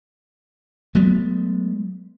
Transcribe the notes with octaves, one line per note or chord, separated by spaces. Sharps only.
F#3 G#3 A3 B3